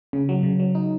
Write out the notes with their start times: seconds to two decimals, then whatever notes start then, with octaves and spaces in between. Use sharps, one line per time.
0.13 C#3
0.29 F#3
0.43 C#3
0.59 F#3
0.75 D#4